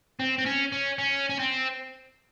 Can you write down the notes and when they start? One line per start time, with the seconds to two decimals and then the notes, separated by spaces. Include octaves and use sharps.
0.20 C4
0.38 C4
0.46 C#4
0.72 C#4
0.98 C#4
1.30 C#4
1.39 C4